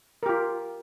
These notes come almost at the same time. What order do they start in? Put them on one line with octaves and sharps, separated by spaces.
A#4 G4 F4